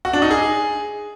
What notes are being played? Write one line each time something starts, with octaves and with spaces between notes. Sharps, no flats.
F#4
D4
D#4
G#4